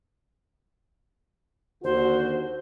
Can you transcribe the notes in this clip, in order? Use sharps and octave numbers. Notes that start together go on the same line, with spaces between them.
D#2 D3 F#4 C5